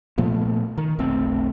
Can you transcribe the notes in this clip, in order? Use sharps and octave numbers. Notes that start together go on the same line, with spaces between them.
A#2 F3 A3 B3
D#3
F1 B1 A3 C4